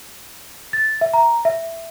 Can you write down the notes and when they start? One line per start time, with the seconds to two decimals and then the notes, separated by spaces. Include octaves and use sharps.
0.73 A6
1.01 E5
1.14 A#5
1.45 E5